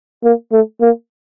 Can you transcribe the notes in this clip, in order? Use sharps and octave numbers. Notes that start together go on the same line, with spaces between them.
A#3
A3
A#3